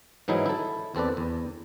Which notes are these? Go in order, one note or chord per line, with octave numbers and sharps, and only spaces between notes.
G#2 E3 F#3 D#4 E4 G#4
E4 A4
E2 C4 A4 B4 D5
E2